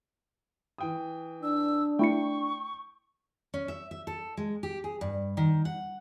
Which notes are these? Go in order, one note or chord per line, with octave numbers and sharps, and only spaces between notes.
E3 G5 D#6
D4 E6
A3 E4 G5 C#6 C#7
C#4
E5
E5
A4
G#3
G4
G#4
G2
D#3
F#5